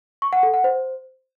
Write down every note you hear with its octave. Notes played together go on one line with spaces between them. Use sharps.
C#6
F#5
A4
F#5
C5